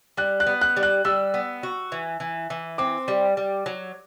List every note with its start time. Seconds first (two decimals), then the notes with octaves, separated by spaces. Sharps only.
0.17 G3 F#6
0.40 F#6
0.47 B3
0.61 F#6
0.76 G3
0.83 F#6
1.05 G3 E6
1.34 B3
1.63 F#4
1.92 E3
2.20 E3
2.50 E3
2.78 C4 D6
3.08 G3
3.37 G3
3.66 F#3